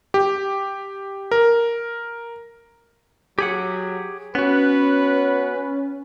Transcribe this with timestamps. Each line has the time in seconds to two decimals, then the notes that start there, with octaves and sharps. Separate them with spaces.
0.14 G4
1.31 A#4
3.39 F#3 G4 G#4 F#5
4.35 B3 C#4 F#4 B4